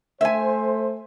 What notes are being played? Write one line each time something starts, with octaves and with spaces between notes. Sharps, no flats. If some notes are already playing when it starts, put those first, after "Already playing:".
A3 C5 E5 G#5